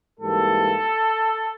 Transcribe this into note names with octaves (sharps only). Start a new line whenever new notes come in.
G#2 E3 G3 A#3 A4